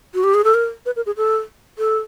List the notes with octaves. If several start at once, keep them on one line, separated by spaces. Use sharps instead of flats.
F#4
G4
G#4
A4
A#4
B4
A#4
G#4
A4
A4